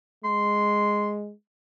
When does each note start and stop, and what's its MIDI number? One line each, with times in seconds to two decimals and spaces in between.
0.24 1.33 56
0.24 1.14 84